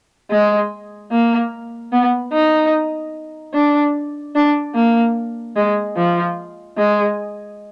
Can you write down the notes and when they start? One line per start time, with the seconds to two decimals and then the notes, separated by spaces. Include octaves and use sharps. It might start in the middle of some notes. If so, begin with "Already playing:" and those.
0.31 G#3
1.11 A#3
1.92 B3
2.33 D#4
3.54 D4
4.35 D4
4.75 A#3
5.56 G#3
5.96 F3
6.77 G#3